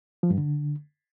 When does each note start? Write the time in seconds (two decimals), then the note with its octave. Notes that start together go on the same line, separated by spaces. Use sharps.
0.23 F3
0.30 G2
0.38 D3